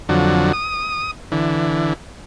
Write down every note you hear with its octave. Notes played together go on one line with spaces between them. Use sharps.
F2 D3 F#3
D#6
D3 E3